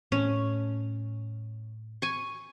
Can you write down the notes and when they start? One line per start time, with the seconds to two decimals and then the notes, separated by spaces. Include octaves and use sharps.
0.12 A2 C#4
2.02 G#5 C#6